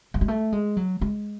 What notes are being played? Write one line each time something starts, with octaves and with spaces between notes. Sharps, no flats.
F#3
G#3
A3
G#3
F#3
G#3